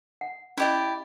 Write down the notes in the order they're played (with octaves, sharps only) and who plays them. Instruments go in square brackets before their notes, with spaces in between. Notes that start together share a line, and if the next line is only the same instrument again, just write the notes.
[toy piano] F#5
[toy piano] C#4 D#5 [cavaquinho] E4 G4 D5